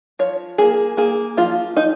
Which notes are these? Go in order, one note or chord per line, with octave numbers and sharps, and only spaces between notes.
F3 C#5
A#3 G#4
A#3 G#4
F3 F4
F3 D#4